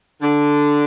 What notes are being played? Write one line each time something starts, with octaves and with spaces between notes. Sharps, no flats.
D3